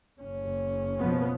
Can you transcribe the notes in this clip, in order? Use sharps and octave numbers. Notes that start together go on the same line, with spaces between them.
F#1 C#4
B2 F3 B3